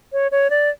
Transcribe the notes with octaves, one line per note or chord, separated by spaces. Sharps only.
C#5
C#5
D5